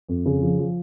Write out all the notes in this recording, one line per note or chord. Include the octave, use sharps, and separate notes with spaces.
F2
C#3
F3
F3